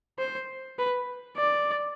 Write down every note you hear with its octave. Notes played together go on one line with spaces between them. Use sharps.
C5
B4
D5